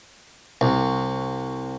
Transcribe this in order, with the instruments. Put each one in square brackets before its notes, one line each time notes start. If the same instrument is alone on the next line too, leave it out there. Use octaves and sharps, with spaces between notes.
[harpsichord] C2